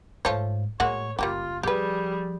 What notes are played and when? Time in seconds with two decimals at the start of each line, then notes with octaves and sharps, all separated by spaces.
0.25 G#2 F3 A3 C#5
0.80 A2 G#3 A#3 F#4 C#5
1.19 F#1 G3 A#3 F4 G4
1.63 F3 G3 G4 G#4 B4